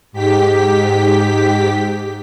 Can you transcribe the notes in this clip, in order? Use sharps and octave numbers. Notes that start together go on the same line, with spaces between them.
G#2 G4 B6